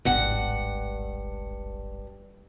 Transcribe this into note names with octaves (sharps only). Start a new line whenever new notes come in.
D1 G#1 G2 F#5